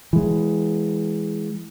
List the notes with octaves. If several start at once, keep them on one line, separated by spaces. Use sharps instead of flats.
E3 G#3